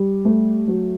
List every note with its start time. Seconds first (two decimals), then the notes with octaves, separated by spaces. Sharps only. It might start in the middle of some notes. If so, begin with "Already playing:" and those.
Already playing: G3
0.25 A3
0.68 F#3